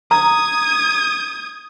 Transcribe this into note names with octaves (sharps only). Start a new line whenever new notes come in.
A#5 D#6 G#6